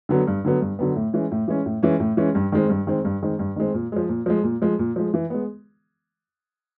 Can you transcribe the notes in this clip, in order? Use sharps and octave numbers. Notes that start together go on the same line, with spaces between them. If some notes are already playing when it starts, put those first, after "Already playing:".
D3 F#3 B3
G2
D3 F#3 B3
G2
D3 F#3 B3
A2
E3 G#3 C#4
A2
E3 G#3 C#4
A2
E3 G#3 C#4
A2
E3 G#3 C#4
G2
D#3 G#3 C4
G2
D#3 G#3 C4
G2
D#3 G#3 C4
G2
D#3 G#3 C4
A#2
F3 G#3
A#2
F3 G#3
A#2
F3 G#3
A#2
F3 G#3
E3
G#3 B3